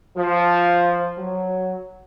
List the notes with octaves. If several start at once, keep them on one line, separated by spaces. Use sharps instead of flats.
F3
F#3